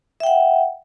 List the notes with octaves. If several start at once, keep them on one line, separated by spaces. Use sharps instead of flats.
E5 F#5 G5